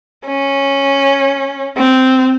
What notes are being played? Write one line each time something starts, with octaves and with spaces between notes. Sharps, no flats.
C#4
C4